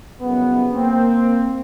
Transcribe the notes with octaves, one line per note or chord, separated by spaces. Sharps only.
C2 F#2 C#3 B3
A#3 C4